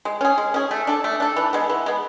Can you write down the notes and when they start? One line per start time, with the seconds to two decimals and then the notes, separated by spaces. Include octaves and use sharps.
0.05 G#3
0.21 C#4 G#4
0.38 G#3
0.54 C#4 G#4
0.71 A3
0.87 D4 A4
1.04 A3
1.20 D4 A4
1.36 E3
1.53 G#3 B3
1.70 E3
1.86 G#3 B3